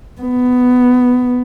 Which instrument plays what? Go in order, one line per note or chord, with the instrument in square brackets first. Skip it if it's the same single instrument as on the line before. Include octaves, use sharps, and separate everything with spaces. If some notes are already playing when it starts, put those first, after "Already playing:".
[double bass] B3